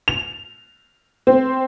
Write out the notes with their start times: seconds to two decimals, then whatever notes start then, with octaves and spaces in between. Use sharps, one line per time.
0.08 F7
1.27 C4